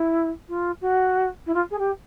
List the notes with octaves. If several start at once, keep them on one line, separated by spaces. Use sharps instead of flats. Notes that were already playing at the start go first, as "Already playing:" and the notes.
Already playing: E4
F4
F#4
E4
F4
G#4
G4